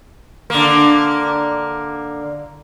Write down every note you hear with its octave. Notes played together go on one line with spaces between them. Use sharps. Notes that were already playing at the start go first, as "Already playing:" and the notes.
D3 A#3